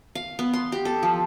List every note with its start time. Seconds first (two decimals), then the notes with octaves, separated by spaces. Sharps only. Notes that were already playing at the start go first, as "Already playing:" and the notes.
0.15 F5
0.39 B3
0.54 C6
0.72 G4
0.85 A4
1.03 F3